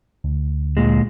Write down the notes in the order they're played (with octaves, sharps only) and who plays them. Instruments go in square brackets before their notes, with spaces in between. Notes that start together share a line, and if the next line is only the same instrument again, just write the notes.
[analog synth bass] D2
[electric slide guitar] A#2 G#3